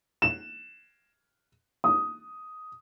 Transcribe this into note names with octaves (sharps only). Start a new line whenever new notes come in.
E7
D#6